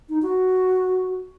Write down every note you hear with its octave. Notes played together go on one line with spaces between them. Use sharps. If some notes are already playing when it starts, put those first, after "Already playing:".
D#4
F#4